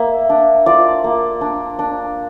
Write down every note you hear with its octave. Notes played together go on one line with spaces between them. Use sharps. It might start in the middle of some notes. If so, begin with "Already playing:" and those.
Already playing: A#3 E5
D4
F4 D5
A#3
D4
D4